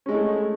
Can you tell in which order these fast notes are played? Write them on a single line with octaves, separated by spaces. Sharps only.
C#4 G#3 E4 A3